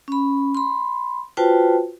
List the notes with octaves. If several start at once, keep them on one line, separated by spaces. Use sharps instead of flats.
C#4 B5
B5 C6
F4 F#4 B4 C5 G5 A5